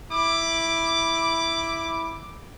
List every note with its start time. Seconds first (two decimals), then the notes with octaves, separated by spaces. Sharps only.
0.12 E4 D6